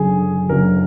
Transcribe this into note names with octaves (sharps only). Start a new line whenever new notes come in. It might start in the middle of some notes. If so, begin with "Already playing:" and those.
Already playing: F#1 F#2 D3 G#4
F#1 F#2 D3 A#4